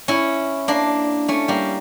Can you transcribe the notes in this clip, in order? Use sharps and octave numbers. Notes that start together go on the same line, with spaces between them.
C#4 E4
A#3 D4
A3 C#4
G3 A#3